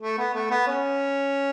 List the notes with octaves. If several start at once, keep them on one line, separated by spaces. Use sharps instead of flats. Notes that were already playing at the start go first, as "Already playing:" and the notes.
A3
B3
A3
B3
C#4